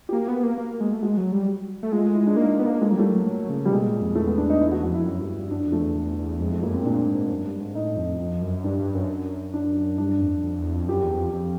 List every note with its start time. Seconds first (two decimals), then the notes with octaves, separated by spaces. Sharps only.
0.09 G4
0.13 A#3 F#4
0.28 B3
0.43 A#3
0.58 A#3
0.80 G#3
0.93 A3
1.02 G#3 F#4
1.17 F#3
1.32 G3
1.83 A3
1.92 G#3 F4
2.14 E4
2.27 D4
2.36 A#3 D#4
2.59 B3
2.66 A#3
2.81 G#3 A3
2.90 F#3 A#3
2.97 G3 A3
3.12 F#3
3.27 F#3
3.49 C#3
3.65 G3
3.71 B2 G#3
3.86 A#2
4.01 F2
4.15 E2 A3
4.27 B3
4.38 D4
4.50 D#4
4.61 E2 E4
4.72 F#4
4.83 F2 F#4
4.94 E4
5.06 F#2
5.20 G2
5.35 G2
5.51 F#2 D4
5.65 F2
5.72 A3
5.80 E2
5.95 E2
6.18 E2
6.40 F2 G#3
6.52 A3
6.62 F#2 A#3
6.74 C4
6.85 A#2 D4
7.07 G#2
7.29 F#2
7.45 G2
7.60 G#2
7.74 A2 D#4
7.97 F2
8.20 F2
8.42 F#2
8.64 G2 D4
8.79 G2
8.94 F#2
9.54 D4
9.98 G2 D4
10.21 F2
10.44 F2
10.59 E2
10.74 F2
10.88 F#2 G4
11.03 E2
11.18 F2
11.33 F2